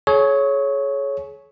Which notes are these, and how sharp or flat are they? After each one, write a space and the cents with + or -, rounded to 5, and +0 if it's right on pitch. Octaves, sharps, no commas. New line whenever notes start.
G#4 +40 C#5 +0